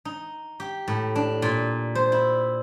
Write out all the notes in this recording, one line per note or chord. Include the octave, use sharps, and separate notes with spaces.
D#4
G4
A2
D4
A#2
C5
E4